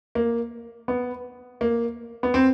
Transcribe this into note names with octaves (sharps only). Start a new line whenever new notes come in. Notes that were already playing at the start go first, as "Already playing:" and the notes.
A#3
B3
A#3
B3
C4